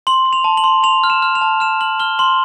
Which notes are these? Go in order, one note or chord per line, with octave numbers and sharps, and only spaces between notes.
C6 F#7
C6
F7
A5
F#7
C6
C6 F7
F6
E7
F6
F7
A5
F6 E7
F6 F#7
F6 G7
C6 F#7